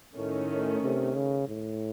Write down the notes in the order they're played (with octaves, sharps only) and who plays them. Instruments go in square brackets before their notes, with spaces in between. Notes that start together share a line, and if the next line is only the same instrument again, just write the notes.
[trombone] A2 [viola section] D#3 A3 C#4
[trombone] C3
C#3
A2